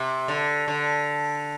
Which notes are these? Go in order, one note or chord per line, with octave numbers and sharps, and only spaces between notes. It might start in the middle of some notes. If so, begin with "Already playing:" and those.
Already playing: C3
D3
D3